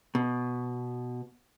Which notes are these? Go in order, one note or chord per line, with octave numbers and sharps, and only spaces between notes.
B2